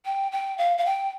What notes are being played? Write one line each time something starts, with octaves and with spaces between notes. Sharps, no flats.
G5
G5
F5
F5
G5